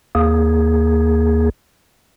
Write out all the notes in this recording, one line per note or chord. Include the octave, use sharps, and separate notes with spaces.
D#2 A#3 G#4